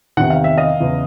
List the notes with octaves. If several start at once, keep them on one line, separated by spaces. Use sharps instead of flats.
E2 C3 D#3 F#5
F5
E5
D#5 F5
E2 C#3 E3